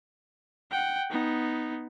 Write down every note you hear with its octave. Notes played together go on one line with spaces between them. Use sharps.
F#5 G5
B3 D#4